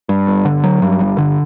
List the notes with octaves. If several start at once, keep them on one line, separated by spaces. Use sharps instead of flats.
G2
G1
D3
F#3
G2
G1
D3